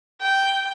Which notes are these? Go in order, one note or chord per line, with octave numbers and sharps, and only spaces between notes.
G5